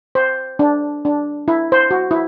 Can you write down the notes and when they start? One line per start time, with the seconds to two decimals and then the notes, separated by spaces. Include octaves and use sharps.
0.15 C5
0.59 D4
1.05 D4
1.48 E4
1.72 C5
1.91 F#4
2.11 E4